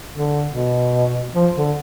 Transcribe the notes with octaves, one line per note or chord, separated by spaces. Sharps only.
D3
B2
F3
D3